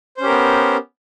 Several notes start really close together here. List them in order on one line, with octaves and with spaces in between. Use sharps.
C5 C#4 G4 A#4 B3